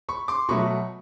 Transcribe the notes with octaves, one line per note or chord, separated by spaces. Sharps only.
B5 C#6
C6 D6
B2 F#3 A3 B5 C#6